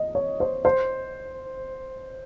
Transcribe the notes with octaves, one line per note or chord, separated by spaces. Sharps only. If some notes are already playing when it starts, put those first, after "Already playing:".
Already playing: D#5
C#5
C5
C5